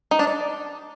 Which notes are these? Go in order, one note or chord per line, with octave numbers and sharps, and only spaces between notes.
D#4
D4
D5